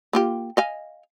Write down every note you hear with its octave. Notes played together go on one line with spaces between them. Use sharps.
A#3 F4 G4
D#5 F5 G#5